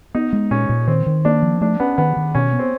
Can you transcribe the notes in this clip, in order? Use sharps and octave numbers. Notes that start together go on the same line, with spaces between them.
B3 D#4
G#3
A#2 C#4
A#2
D#3 C4
D#3
A#3 D4
F3
A3 D4
B3 C#4
D#3 B3
D#3
B2 C#4
B3
C4